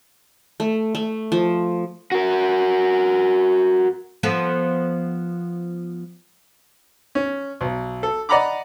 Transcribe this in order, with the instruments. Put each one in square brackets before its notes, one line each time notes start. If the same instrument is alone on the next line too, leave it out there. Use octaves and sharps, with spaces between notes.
[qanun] A3
A3
F3
[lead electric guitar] F#4 A#4
[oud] F3 B3 A4
[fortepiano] C#4
B1
A4
D5 D#5 F#5 A#5 B5 D6